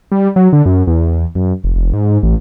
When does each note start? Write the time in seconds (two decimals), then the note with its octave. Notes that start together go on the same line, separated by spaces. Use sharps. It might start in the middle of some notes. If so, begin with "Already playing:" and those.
0.12 G3
0.36 F#3
0.53 D3
0.66 F#2
0.87 E2
1.35 F#2
1.64 F1
1.75 F1
1.93 G#2
2.23 A1